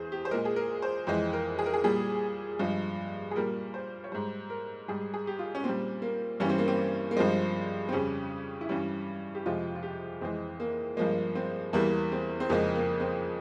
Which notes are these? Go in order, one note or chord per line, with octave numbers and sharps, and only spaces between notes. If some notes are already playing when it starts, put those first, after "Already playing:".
Already playing: E2 E3 G#4 C5
G4
C5
A#2 G#3 A#4
G#4
A#4
C5
F2 E3 G#3 C5
A#4
G#4
A#4
G#4
A#2 G3 G#4
G2 F3 G#3
G#4
A#2 G3 A#4
C5
C#5
G#2 G3 C5
A#4
G#2 G3 G#4
G#4
G4
F4
C#4
A#2 G3 C4
A#3
G2 E3 G3 C#4
C4
A#3
C4
A#3
G2 F3 G#3 C4
C4
F2 C#3 G3 C#4
E4
G2 E3 G3 C#4
G4
F2 C3 F3 G#3 F4
F4
G4
F2 E3 G#3 C4
A#3
G2 F3 G#3 A#3
C4
E2 E3 G3 A#3
C4
C4
F2 C#3 F3 G#3 A#3
A#3
C4